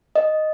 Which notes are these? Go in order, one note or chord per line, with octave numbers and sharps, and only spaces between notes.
D#5